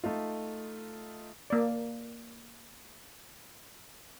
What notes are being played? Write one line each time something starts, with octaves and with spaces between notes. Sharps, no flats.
A3 D#4 F4
A#3 D5